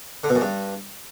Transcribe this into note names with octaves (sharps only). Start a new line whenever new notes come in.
D3
B2
F#2
G2